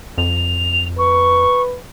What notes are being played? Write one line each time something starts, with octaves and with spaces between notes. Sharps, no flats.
F2 F7
B4 C#6